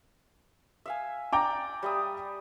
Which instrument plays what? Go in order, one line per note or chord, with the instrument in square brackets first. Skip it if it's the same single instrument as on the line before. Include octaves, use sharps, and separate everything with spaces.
[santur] E5 F5 G#5
[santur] D5 [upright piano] G5 A#5 D6
[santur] G3 E5 D#6